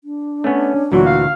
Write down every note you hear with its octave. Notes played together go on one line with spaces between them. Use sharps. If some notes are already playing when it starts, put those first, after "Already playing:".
D4
A3 B3 C#4
D2 A#2 E3 F#3 F#4
F5